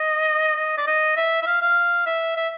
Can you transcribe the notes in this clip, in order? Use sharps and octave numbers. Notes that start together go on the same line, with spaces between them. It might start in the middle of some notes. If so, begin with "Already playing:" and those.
Already playing: D#5
D#5
D5
D#5
E5
E5
F5
F5
E5
E5